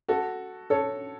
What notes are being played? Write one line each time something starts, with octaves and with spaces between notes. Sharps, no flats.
F#4 A4
A4 C#5